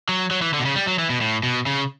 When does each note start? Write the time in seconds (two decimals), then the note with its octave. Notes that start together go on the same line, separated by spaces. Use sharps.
0.09 F#3
0.31 F#3
0.42 E3
0.54 D3
0.60 B2
0.65 C#3
0.75 G3
0.87 F#3
0.99 E3
1.10 B2
1.21 A2
1.43 B2
1.66 C#3